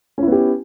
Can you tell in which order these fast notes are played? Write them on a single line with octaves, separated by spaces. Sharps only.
C#4 E4 B3 G4